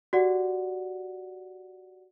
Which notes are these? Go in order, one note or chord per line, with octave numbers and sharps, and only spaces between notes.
F#4 G4 D5 F#5